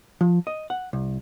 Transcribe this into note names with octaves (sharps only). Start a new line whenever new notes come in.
F3
D#5
F#5
C2